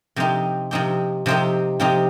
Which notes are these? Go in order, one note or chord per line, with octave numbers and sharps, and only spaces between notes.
C3 F3 C4 D#4 G4
C3 F3 C4 D#4 G4
C3 F3 C4 D#4 G4
C3 F3 C4 D#4 G4